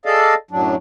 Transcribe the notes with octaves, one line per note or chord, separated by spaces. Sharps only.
G#4 A4 D5 D#5 F5 A5
F#2 A2 F#3 D4